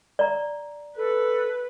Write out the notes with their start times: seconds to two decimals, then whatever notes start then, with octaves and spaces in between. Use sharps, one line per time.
0.19 D5 A#5
0.97 A4 B4